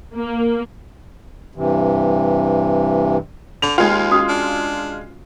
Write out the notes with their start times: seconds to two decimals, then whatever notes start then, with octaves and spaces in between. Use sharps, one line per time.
0.15 A#3
1.55 G2 C3 E3
3.62 D3 F7
3.78 D#2 G#3 F4 G5
4.11 C#4 F#4 D#6
4.29 D4